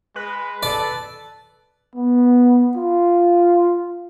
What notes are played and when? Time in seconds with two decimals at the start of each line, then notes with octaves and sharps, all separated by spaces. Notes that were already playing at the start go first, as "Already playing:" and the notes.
0.16 G#3 B4
0.63 A4 D5
1.96 B3
2.77 F4